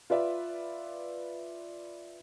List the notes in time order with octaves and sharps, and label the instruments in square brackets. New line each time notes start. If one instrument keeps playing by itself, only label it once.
[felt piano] F4 B4 D5 E5